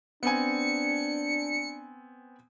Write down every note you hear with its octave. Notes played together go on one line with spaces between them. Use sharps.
B3 C4 D4 G#5 C#7